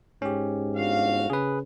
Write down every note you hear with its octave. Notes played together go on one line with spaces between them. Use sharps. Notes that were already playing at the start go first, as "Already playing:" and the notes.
G#2 C#4 G4
G1 F#4 F5
C#3 G#4 B4